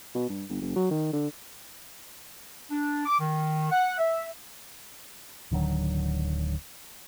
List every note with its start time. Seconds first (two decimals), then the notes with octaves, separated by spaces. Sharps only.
0.15 B2
0.29 G2
0.50 G1
0.61 F#1
0.76 F#3
0.91 D#3
1.13 D3
2.71 D4
3.06 D6
3.20 D#3
3.71 F#5
3.98 E5
5.51 D1 D3 D#3 F#3